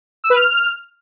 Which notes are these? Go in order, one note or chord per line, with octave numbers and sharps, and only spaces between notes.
E6
B4
F6